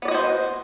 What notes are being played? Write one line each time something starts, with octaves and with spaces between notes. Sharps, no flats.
B3 F#4 C5 D5 D#5